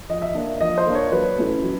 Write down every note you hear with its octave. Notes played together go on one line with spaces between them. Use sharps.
F3 D#5
E5
A#3 D4
F3 D#5
C5
A#3 D4
C#5
F#3 B4
A3 C#4 E4
F#3